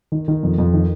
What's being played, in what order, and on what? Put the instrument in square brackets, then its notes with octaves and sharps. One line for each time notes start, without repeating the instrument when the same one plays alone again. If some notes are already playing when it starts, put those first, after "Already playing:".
[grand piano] D#3
D#3
F2
F2
D#3